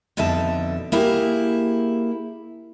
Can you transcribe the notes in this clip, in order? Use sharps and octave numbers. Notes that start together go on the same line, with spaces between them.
F2 B2 D3 D#4 E5 A5
A#3 E4 G4 G#4